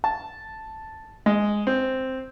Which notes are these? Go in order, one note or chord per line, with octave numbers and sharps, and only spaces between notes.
A5
G#3
C4